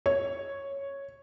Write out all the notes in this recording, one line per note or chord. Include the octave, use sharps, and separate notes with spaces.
C#5